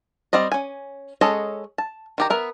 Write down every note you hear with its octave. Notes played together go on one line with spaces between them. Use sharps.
G3 C4 D5 D#5
C#4 G#5
G#3 C#4 A4 C#5 D#5
A5
D#3 G4 A#5
B3 A#4 E5